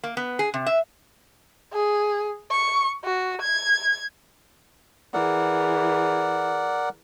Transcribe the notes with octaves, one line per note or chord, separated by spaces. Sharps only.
A#3
B3
G#4
C3
E5
G#4
C#6
F#4
G#6
E3 G#4 A#4 D5 F#5